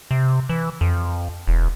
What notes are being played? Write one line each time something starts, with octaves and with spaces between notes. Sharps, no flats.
C3
E3
F2
E1